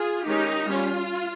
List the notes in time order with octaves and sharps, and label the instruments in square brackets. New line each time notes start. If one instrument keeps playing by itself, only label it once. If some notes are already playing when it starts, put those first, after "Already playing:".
Already playing: [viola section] F4 G#4
D#3 G#3 C#4 D#4 G4
G3 C#4 F4